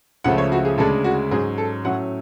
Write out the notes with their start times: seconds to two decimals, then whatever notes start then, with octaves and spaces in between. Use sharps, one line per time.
0.24 C#2 C#3 F3 A3 F#5
0.38 C#5
0.52 F#4
0.65 G#4
0.78 D2 C#3 G#3 D4 A4
1.04 F#4
1.31 G#2 F#3 C#4 G#4
1.58 A4
1.85 A2 F#3 A3 C#4 F#5